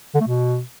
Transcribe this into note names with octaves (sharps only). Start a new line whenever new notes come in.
D3
A3
B2